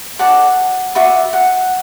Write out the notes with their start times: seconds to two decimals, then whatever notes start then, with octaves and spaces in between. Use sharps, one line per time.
0.19 F#4 A4 D5 F#5
0.95 F#4 B4 D5 E5
1.33 F#5